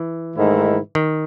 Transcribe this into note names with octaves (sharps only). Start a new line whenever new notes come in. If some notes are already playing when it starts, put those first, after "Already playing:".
Already playing: E3
G#2 D#3 A3 E4
D#3